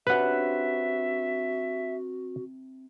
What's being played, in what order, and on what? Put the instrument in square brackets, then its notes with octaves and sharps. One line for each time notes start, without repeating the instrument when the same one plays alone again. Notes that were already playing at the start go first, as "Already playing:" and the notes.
[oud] C3 C#4 D4 [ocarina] F#4 [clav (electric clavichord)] B4 F#5 [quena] E5